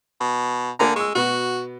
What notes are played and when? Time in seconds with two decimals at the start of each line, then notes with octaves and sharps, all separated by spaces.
0.20 B2
0.79 D3 A#3 G#5 A#5
0.96 G#3 C#6 E6
1.15 B2 B3 F#4